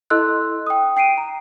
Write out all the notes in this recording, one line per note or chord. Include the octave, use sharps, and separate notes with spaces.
E4 A4 D#5 C6 E6 F#6
G5 D#6
G5 C7 D7 D#7
A#5